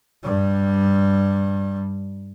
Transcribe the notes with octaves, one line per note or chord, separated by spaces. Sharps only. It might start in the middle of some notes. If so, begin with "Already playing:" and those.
G2 G3